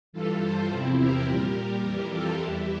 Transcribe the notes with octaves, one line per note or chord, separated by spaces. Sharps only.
G2 E3 G3 F4 A4
A4 C5
E2 C3 F3 C4 E4
G4 A#4
A#2 G3
F2 E3 G3 G4 A#4
F4 A4
E2 E3 G3 E4 G4